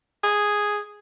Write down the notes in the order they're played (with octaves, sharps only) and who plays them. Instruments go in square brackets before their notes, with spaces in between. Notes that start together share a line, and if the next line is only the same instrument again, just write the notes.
[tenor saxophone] G#4